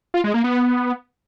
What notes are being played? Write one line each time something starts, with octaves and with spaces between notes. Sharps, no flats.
F4
G#3
A#3
B3